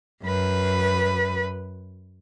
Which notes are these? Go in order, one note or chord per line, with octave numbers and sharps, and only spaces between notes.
F#2 B4